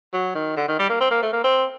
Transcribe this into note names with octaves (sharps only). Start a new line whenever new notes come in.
F#3
D#3
D3
D#3
G3
A#3
C4
A#3
A3
A#3
C4